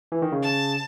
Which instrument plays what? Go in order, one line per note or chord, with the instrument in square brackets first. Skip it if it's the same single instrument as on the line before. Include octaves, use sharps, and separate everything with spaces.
[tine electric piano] E3
D#3
C#3
[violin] A5